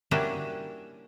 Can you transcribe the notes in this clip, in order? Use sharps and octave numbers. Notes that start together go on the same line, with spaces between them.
G3 A#3 C#4 D4 E4 F#4